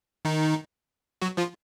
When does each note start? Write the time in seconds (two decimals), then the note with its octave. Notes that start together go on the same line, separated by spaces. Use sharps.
0.25 D#3 D#4
1.22 F#3 F#4
1.37 F3 F4